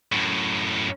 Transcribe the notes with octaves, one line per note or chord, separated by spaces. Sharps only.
F#2 A2